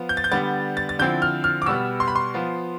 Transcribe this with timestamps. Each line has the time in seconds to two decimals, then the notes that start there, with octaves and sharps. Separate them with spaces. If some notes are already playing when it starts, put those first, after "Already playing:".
Already playing: F3 B3 F4
0.09 G6
0.17 A6
0.24 G6
0.31 D3 G3 B3 A6
0.77 A6
0.89 A6
0.99 D3 F3 C4 E4 G6
1.22 F6
1.44 F6
1.62 D6
1.66 B2 G3 B3 E6
2.00 C6
2.08 B5
2.15 C6
2.34 F3 B3 F4